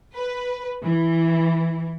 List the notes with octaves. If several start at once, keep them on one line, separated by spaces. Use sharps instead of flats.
B4
E3